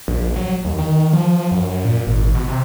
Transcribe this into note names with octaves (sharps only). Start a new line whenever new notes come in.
A#1
F#3
D#2
D#3
F3
F#2
A#2
G#1
B2
C3